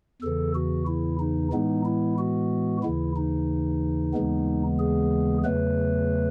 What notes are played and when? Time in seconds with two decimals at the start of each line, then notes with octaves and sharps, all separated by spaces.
0.22 E2 C#3 E3 A4
0.55 F#4
0.87 E4
1.20 D#4
1.52 A2 E3 G#3 B3 D#4
1.85 E4
2.18 F#4
2.83 D#2 C#3 E3 E4
3.16 D#4
4.13 D#2 C#3 E3 G#3 B3
4.79 G#4
5.44 E2 C#3 F#3 A3 B4